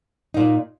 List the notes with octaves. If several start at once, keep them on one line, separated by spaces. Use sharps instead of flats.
A#2 A#3 D#4